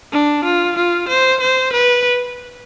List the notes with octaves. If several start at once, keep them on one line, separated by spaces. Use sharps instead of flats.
D4
F4
F4
C5
C5
B4